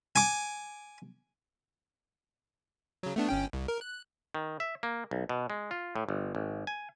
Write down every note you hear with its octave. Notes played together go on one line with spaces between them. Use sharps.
G#5 D6
C#3 F#3
A3 B3 D4
G1 C#4 G5
C2
A#4
F#6
D#3
E5
A#3
B1
B2
G#3
F4
A2
G1
G#1
G#5